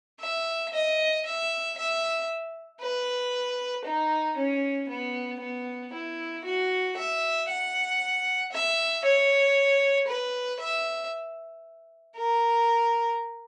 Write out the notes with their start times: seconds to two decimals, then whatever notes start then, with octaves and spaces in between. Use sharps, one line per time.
0.21 E5
0.73 D#5
1.26 E5
1.77 E5
2.81 B4
3.85 D#4
4.37 C#4
4.89 B3
5.40 B3
5.93 E4
6.45 F#4
6.97 E5
7.49 F#5
8.52 E5
9.05 C#5
10.08 B4
10.60 E5
12.16 A#4